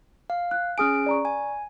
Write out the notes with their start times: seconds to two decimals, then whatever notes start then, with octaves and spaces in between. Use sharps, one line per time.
0.30 F5
0.51 F#6
0.78 C#4 G#4 G#5 D#6 F6 D7
1.06 D5 A#5 C#6
1.25 G#5